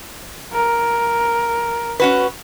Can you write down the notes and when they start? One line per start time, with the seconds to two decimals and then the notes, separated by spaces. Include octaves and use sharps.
0.53 A#4
2.00 C#4 F#4 B4